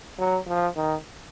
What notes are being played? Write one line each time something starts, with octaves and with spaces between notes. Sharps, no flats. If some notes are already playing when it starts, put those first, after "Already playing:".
F#3
F3
D#3